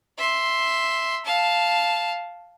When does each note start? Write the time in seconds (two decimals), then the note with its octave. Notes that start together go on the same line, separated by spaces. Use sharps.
0.18 E5 C6
1.25 F5 A5